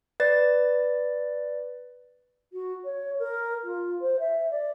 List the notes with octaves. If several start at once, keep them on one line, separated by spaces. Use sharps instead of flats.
B4 D5 A6
F#4
C#5
A#4
F4
C5
E5
D5